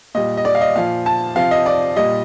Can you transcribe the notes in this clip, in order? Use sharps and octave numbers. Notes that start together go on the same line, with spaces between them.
A#2 G3 D#5
D#5
D5
F5
D#5
A#2 F3 F5
A5
C3 F3 F5
D#5
D5
A#2 G3 D#5